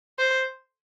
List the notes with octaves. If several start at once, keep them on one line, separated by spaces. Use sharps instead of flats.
C5